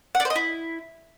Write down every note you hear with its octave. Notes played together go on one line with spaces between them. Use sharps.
F#5
D5
C5
D#5
E4